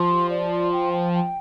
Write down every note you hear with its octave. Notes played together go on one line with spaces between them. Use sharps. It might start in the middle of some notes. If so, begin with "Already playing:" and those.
Already playing: F3 C6
G4
D5
C6
G5
G5
G5